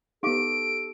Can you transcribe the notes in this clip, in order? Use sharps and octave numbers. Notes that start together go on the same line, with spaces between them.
B3 D#4 G4 A4 F5 D6 D7